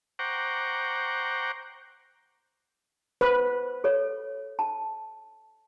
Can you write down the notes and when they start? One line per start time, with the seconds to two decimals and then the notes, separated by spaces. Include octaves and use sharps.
0.19 C5 F#5 G5 A#5 C#6 D6
3.21 B4 C5
3.84 A4 C#5
4.59 A5